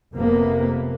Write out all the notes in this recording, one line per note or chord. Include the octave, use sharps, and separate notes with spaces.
F1 F2 C3 A#3 B3